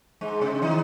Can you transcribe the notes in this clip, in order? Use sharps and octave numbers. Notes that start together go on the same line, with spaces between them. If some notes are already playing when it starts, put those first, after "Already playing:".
G#2 G#3
C3 C4
D#3 D#4